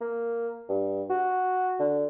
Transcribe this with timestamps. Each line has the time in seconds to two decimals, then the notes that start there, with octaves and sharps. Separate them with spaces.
0.01 A#3
0.69 G2
1.10 F#4
1.79 D3